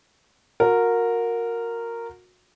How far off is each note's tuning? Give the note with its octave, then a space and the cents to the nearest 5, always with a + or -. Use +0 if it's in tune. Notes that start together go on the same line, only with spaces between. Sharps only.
F#4 -30 A#4 -10